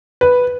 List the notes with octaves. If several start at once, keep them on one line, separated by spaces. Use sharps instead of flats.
B4